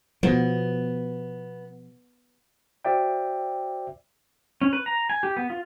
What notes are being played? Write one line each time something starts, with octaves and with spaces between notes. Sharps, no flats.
B2 F3 B3
F#4 C5 D5 E5 G5
C#4
B4
A#5
G#5
G4
B3
F4